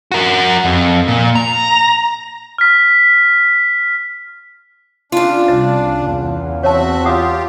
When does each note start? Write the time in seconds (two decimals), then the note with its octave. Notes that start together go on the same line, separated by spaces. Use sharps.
0.12 F#4 A#4
0.65 F2
1.08 A#2
1.35 A#5
2.58 F6 B6
5.12 C#3 D4 F4
5.48 C2 D#5
6.02 E2
6.63 C4 F#4 C#5 E5 A5
7.05 F4 G4 F#5 D#6